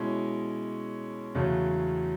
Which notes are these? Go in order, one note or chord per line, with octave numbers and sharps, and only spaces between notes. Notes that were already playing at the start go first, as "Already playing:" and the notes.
Already playing: B2 G#3 C#4 E4
E2 C#3 F#3 A3